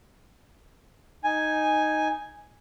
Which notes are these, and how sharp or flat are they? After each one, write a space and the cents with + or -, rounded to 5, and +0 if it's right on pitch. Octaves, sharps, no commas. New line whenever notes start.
D#4 +0 G#5 +0